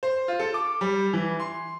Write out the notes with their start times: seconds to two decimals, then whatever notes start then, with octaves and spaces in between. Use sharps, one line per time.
0.03 C5
0.28 F4
0.39 A4
0.54 D6
0.81 G3
1.13 E3
1.40 C6